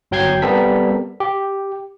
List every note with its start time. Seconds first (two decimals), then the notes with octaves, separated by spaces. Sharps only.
0.11 G1 F#3 G5 G6 G#6 C7
0.42 G3 B3 C4 A4 A#4 B6
1.20 G4